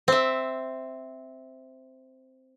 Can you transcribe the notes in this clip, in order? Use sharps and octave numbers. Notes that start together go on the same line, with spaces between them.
C4 E5